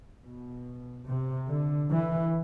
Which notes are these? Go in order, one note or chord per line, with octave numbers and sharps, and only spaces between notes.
B2
C3
D3
E3